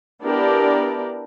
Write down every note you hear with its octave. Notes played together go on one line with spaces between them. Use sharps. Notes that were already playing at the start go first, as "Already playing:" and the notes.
B3 D4 E4 G4 A#4 D5